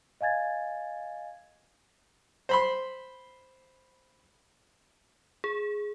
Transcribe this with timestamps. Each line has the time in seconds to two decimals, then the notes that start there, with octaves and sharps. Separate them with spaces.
0.21 D#5 F5 G#5 G#6 A6
2.49 C5 B5 C6
5.44 G#4